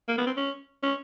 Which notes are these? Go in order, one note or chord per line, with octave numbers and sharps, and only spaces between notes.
A#3
B3
C4
C#4
C#4